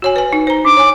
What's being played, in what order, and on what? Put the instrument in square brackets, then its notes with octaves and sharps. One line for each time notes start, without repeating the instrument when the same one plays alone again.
[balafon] F#4 C#5 G#5
B4 G#5
D#4
C5 A#5
[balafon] D4 [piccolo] D6
[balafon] C#5 G#5